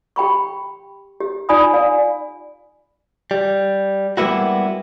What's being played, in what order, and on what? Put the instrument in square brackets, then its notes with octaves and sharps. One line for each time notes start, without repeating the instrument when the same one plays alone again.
[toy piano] G4 G5 B5 C#6
G4
D#4 F4 D5 G#5 B5 D#6
D5 F5 G#5
[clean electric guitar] G3
G3 G#3 A#3 B3 E4 F#4